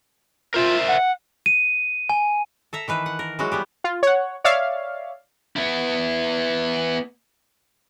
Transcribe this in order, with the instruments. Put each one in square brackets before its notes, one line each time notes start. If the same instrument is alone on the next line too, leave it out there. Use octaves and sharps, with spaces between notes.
[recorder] F4 [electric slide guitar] A#4 C5 E5
[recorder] F#5
[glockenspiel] D#7
G#5
[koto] A4 E5 A#5
D#3 E3 B4
F#5
A#4
E3 F#3 G#3 F#4
G3 B3 G4
[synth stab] F4
C#5 F#5
C#5 D5 E5 F5
[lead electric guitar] B3 E4